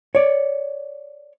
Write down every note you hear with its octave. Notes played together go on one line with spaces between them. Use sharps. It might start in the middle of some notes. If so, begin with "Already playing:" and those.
C#5 D5